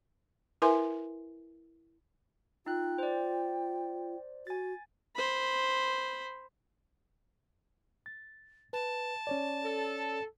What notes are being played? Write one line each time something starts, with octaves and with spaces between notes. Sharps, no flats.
E4 A#4 B4 E5 G#5 C6
D#4 F4 G5 F#6
C5 D5
F#4 G#5 A6
C5 B5
A6
B4 A5
C#4 C#5 D5
A4